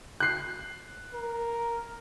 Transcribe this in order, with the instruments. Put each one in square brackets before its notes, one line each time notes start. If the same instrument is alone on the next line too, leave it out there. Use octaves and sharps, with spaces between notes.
[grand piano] F#6 C7
[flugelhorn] A#4